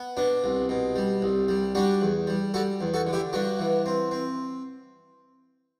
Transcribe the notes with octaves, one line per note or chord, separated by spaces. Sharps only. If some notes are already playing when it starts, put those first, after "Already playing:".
Already playing: B3
B2 D4
C2
B2
G3
C2
G3
G3 D4 F#4
E2
G3
G3 F#4 A4
E2
F#4 A4
D3
E4 G4
G2 D4 F#4
E3
C4
C4